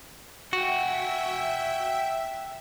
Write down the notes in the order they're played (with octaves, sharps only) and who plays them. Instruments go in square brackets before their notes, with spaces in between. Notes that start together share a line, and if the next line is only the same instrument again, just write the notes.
[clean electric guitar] F#4 [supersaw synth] E5 [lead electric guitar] F#5 G5